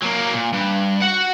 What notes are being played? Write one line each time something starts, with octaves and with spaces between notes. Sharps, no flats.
F#3 A#3
A#2
G2
F#4 F#5